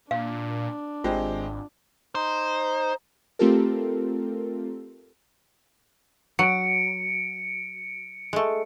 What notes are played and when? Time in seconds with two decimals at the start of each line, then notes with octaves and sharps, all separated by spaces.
0.11 A#2 D4 F5
1.04 G#1 G#3 C4 F4 G4
2.15 D#4 C5
3.39 A3 C4 F4 G4 A4 A#4
6.39 F#3 C#7 D7
8.33 G#3 A3